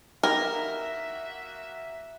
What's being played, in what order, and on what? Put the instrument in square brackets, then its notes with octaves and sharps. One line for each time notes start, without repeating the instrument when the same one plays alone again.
[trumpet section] A#3 F#4 E5 [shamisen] D#4 E4 G4 [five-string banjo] A#4